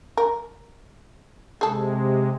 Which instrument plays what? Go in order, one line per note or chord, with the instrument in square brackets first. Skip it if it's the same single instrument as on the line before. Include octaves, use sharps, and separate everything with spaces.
[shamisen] A#4
[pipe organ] C3 G#3 [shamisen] G#4 A4